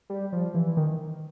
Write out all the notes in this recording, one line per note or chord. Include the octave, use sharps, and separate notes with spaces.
G3
F3
E3
D#3